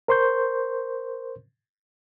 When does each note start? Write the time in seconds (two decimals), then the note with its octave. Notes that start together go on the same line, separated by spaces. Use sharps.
0.08 A#4 C5 C6 C#6 G6